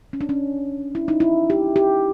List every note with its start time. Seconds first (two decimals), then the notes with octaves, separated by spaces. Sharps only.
0.13 C#4
0.21 D4
0.29 C#4
0.95 E4
1.08 D#4
1.20 E4
1.50 G4
1.76 G4